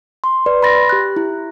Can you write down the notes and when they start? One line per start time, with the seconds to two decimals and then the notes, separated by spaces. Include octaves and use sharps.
0.24 C6
0.46 B4 D5
0.62 B5 C6 A6 A#6
0.89 G4 F#6
1.16 E4